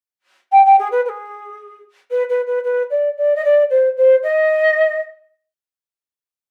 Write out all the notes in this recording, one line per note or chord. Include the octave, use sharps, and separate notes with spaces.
G5
G5
G#4
B4
B4
G#4
B4
B4
B4
B4
D5
D5
D#5
D5
C5
C5
D#5